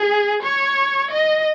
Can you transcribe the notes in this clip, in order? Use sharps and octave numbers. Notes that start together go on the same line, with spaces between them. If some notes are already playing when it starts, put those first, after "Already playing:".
Already playing: G#4
C#5
D#5